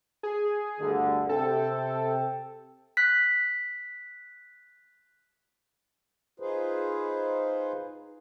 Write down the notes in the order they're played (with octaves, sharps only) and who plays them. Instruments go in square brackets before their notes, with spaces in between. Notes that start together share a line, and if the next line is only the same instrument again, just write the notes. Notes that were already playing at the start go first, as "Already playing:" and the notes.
[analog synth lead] G#4
[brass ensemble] D2 G2 D3
[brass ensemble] C3 G5 [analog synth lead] A4
[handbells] F#6 B6
[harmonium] D#4 F4 G#4 B4 C5